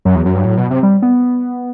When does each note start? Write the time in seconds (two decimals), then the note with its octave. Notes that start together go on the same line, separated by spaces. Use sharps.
0.05 F#2 F#3
0.15 E2
0.26 F#2
0.35 G2
0.45 A2
0.57 B2
0.70 C3
0.83 G3
1.02 B3